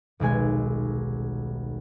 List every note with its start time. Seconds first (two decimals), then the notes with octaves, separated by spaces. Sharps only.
0.20 D#1 B1 G#3 G#5